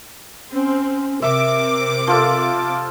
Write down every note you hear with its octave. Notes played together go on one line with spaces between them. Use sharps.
C4 C#4
C3 A#4 E5 D6
F3 F4 A4